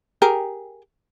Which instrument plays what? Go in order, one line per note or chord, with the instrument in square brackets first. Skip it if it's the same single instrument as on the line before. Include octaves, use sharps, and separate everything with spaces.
[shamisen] G4 G#4 A#4